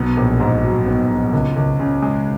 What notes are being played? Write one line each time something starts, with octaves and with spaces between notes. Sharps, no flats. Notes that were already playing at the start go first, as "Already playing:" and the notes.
Already playing: B1 B3
A#1
G#2
F#3
B3
A#1
C#2
C#2
C#3
G#3